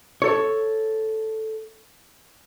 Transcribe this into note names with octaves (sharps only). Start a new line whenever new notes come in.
A4 C#5